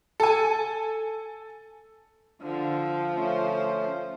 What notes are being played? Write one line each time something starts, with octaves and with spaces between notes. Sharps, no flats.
A4 G#5
D3 F3
A3 C#4 C5